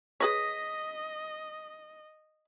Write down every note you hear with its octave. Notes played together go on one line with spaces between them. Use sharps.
G#4 B4 C#5 D#5 D#6 A#6 B6